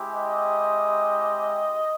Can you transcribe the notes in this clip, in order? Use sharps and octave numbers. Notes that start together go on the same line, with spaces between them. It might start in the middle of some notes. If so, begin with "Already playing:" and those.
Already playing: G#3 C4 E4 G4
D#5